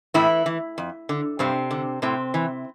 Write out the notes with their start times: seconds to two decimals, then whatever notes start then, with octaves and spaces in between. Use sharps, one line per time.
0.14 A2 E3 E4
0.46 E3
0.78 F2
1.09 D3
1.39 G2 C3 C4
1.71 D3
2.02 A2 C3 C4
2.34 E3